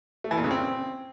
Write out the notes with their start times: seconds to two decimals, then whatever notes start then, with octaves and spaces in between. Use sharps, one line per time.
0.24 A3
0.31 E3
0.37 A#2
0.44 C#3
0.51 C4